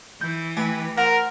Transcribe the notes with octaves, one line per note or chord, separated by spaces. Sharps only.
E3 G6
A3 G4 B4 G#5
A#4 C5 F#5 A#5